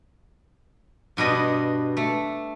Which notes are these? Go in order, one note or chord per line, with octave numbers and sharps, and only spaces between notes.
G2 B2 D4 D#5
A3